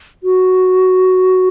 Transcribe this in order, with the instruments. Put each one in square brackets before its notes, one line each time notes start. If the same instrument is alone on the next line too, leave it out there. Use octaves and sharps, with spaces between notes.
[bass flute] F#4